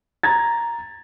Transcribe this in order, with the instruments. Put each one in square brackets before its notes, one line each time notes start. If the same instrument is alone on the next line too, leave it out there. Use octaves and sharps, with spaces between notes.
[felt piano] A#5 G#6 A6